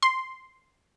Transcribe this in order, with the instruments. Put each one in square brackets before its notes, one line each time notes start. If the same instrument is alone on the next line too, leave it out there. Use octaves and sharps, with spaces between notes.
[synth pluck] C6